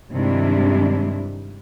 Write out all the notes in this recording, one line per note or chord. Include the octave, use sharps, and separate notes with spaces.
G2 C3 D#3 G#3 D4 E4